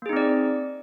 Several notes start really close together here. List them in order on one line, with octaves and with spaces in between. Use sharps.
A#3 G#4 D#4 C4 D5